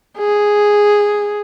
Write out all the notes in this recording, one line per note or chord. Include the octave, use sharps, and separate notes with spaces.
G#4